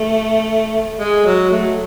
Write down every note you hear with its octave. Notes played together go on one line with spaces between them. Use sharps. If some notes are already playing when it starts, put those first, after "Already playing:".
Already playing: A3
G#3
F#3
A3